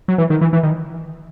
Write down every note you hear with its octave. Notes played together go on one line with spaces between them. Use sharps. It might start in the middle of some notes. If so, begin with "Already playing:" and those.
F#3
E3
D#3
E3
E3
D#3